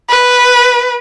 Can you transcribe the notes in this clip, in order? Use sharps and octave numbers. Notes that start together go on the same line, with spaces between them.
B4